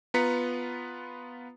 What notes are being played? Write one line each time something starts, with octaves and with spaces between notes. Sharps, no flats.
B3 F4 B4 A#5 B6 C#7